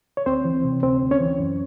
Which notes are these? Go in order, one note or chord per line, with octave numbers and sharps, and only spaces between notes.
C#5
D2 C4 C5
E3
C3
D2 C4 C5
D2
C#4 C#5
E3
F#2